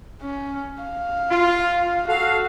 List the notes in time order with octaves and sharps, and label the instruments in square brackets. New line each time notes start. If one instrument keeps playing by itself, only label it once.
[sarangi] C#4
F5
[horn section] F4
[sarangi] F#4 [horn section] A4 F5